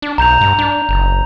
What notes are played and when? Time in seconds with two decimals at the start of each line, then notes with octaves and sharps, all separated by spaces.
0.02 D4
0.18 B1 A#5 G6 F7
0.41 G2
0.59 D4
0.89 F#1